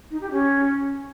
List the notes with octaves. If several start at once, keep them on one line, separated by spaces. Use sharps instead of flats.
D#4
G4
C#4